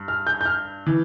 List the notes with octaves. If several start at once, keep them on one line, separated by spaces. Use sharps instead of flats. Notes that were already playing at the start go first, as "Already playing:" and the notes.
Already playing: G2
F6
G6
G6
F6
E3